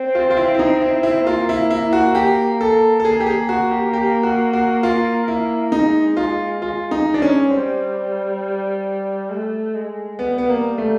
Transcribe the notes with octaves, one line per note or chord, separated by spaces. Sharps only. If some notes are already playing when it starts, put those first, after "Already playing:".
Already playing: C4
F4
F4
E4
E4
D#4
E4
E4
A#3 F4
E4
E4
F#4
G4
A4
A4
A#3 G#4
G4
G#4
F#4
G4
G4
F#4
F#4
F4
E4
G#3 D#4
F4
F4
D#4
D4
C#4
G3 C4
A3
G#3
G3 B3
B3
A#3
A3